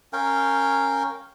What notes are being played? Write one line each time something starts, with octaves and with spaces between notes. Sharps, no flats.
C#4 A#4 F5 G5